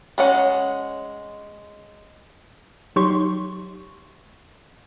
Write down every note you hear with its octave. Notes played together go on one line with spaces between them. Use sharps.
G#3 C#4 F#5
F#3 D#4 G4 C6 C#6